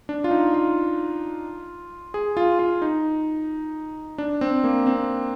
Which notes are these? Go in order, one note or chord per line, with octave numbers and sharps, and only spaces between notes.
D4
F4
D#4
F4
G#4
F4
F4
D#4
D4
C4
A#3
C4